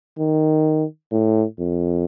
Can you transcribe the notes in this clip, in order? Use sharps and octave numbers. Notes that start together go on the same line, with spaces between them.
D#3
A2
F2